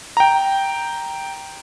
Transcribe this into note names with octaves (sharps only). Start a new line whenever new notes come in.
G5 A#5